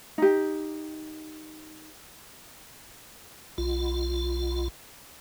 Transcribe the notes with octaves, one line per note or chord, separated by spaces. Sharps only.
D#4 G4
B1 F4